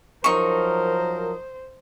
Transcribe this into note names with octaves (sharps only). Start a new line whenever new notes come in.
F3 F#3 D#4 A#4 C5 C#6